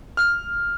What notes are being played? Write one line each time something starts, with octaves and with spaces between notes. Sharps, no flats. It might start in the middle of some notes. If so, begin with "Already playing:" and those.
F6